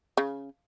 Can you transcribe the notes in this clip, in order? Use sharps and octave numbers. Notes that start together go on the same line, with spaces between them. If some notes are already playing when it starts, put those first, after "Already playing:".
C#3